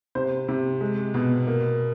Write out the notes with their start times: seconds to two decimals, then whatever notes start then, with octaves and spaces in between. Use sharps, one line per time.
0.15 C3 C5
0.48 C3
0.81 G#3
1.14 B2
1.47 A#3